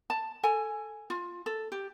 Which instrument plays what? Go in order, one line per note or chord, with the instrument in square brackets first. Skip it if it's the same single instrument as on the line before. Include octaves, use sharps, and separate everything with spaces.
[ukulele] A5
A4 G#5
F4
A4
G4